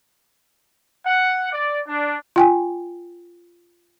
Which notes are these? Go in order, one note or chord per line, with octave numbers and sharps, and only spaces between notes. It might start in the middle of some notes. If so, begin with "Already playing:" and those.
F#5
D5
D4
F4 G5 G#5